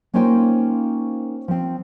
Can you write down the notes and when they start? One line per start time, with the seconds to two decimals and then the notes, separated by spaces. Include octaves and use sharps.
0.14 A#3 C#4 D#4 F4 C5 G5
1.48 F3 C4